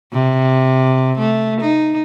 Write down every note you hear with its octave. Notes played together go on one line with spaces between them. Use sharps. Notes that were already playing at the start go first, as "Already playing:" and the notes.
C3
A3
D#4